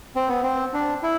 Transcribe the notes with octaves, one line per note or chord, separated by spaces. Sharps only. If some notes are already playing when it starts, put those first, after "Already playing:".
C4
B3
C4
D4
E4